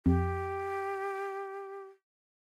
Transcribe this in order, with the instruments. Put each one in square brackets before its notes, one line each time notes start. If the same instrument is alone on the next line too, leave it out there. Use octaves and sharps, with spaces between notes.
[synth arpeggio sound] F2 [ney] G4